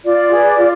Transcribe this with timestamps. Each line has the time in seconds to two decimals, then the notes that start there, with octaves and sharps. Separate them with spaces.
0.03 F4 D5
0.29 G#4 B4
0.56 F4